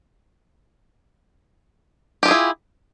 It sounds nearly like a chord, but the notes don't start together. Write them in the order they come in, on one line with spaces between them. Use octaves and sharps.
G4 F4 G#4 E4